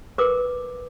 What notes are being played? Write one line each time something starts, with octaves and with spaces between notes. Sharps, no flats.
A#4 B4 D6